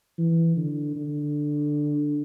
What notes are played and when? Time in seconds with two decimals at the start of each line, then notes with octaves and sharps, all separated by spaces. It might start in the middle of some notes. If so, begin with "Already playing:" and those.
0.18 E3
0.57 D3
0.96 D3